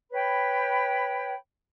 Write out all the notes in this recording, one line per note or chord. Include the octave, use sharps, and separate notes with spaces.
B4 C#5 G5 B5